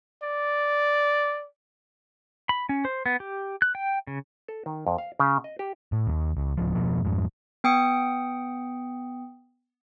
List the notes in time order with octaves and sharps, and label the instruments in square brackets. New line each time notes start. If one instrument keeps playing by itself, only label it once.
[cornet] D5
[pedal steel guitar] B5
C#4
C5
B3
G4
F#6
G5
C#3
[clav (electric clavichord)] A4
D#3
F2
F5
C#3
D#5
G4
[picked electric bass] A2
D#2
C#2
D1 F3
F2 B2 F3
F2 G#2
[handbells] B3 G5 D#6 C#7